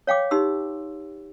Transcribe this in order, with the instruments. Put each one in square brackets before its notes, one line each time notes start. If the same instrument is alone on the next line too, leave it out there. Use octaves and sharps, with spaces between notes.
[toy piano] C#5 F5 G5 D6
D#4 G4 C6 E6